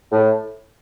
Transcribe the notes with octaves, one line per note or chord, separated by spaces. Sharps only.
A2